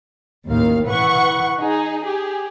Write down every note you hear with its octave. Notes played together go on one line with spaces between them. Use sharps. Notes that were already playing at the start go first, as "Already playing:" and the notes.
A1 D#2 D#3 F5
E3 B4 F#5 C#6
D#4 G#4
G4 G#4